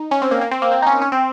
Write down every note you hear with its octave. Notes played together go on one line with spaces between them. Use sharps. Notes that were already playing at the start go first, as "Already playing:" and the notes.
Already playing: D#4
C#4
C4
A#3
A#3
C4
A#3
C4
D#4
C#4
C#4
C4